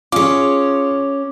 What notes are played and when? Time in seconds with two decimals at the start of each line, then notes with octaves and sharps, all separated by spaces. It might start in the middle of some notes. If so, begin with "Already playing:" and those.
0.12 C#4 F4 G#4 C#5 D6